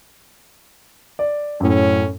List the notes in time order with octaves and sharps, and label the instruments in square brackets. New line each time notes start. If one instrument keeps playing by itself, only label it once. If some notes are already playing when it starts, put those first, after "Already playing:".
[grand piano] D5
[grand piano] F#2 A2 [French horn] C#4